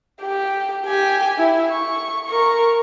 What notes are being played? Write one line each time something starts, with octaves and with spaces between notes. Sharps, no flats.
G4
G4 G#5
E4
C#6
A#4 C#6